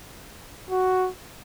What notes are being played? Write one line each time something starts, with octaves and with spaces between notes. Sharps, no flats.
F#4